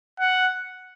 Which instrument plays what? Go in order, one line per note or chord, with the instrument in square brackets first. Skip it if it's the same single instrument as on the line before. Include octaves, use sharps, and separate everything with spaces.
[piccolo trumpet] F#5